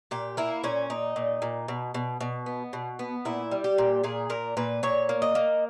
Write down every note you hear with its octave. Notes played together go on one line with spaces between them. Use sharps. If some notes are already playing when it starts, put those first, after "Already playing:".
A#2 G4
A#3 E4
A#2 C#4
A#2 D#4
A#2
A#2
B2
B2
B2
B3
B2
B3
A#2 E4
G3
G4
A#2
A#2 G#4
A#2 A#4
A#2 B4
A#2 C#5
A#3
D#5
A#3